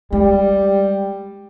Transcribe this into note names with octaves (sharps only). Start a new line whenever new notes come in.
G3 G#3